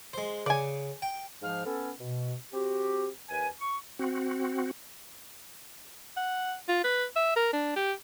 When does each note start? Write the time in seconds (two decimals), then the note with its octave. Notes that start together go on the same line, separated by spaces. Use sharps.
0.14 G#3 C5
0.46 C#3 D5 G#5
1.02 G5
1.42 G#2 F3 F5 F6
1.64 B3 C#4 A4
2.00 B2
2.53 C4 F#4 G4
3.29 D#2 B4 G#5
3.60 C#6
3.99 C4 F#4
6.17 F#5
6.69 F4
6.84 B4
7.16 E5
7.36 A#4
7.53 D4
7.76 G4